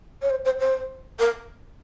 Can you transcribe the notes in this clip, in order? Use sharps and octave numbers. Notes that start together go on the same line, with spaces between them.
C#5
C5
C5
C5
A#4